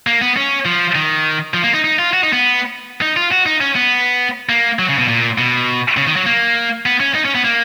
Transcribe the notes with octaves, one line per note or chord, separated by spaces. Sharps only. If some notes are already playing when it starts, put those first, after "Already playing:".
A#3
B3
C#4
F3
D#3
F3
A#3
D#4
D#4
F4
F#4
D#4
B3
D#4
F4
F#4
D#4
C#4
B3
A#3
F#3
C#3
B2
A#2
B2
C#3
D#3
F#3
A#3
B3
C#4
D#4
C#4
B3
A#3